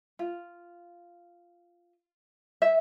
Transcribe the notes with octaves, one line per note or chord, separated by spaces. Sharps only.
F4
E5